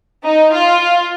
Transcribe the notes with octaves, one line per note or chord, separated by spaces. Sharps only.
D#4
F4